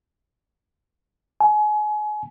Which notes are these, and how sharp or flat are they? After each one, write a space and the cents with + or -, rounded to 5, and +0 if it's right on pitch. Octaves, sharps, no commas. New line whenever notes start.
G#5 +30